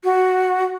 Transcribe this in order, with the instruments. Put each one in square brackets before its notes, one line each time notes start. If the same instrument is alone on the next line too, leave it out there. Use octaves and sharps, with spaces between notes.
[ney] F#4